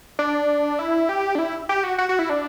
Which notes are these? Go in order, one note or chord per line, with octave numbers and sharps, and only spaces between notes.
D4
E4
G4
D4
E4
G4
F#4
F#4
F#4
E4
D4